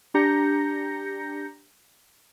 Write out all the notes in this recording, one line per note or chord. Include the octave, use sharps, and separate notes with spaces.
D4 G4 A#5 G6 A#6 C#7